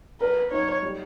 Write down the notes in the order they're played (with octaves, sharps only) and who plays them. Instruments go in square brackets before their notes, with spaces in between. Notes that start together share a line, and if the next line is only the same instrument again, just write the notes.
[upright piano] A#4 [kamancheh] B4
[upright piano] D#4 [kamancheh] C#5
[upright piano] G3